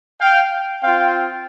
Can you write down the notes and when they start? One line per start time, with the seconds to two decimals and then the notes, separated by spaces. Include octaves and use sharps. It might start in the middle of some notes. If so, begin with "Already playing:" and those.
0.21 F5 G5
0.83 C4 F4 F5 G5